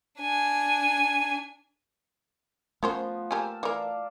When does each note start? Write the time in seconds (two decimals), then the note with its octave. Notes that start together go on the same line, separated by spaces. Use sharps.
0.20 D4 G#5
2.83 F3 A3 B3 C#4 A#4 C5
3.31 A#3 G4 A#4 G#5 A5 E6
3.63 E3 A#4 D5 F5